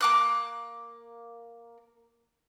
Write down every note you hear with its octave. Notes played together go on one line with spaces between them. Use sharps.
A#3 D6 F#6